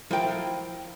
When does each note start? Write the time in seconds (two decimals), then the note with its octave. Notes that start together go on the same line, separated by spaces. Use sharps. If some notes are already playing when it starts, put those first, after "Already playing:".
0.11 F3 E4 A#4 F5 G5